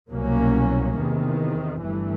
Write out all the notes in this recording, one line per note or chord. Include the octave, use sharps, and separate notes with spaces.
C2 B2 F#3 A#3 C#4
E2 C3 D#3
G1 G2 E3 A3